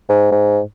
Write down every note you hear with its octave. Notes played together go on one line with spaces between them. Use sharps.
G#2
G#2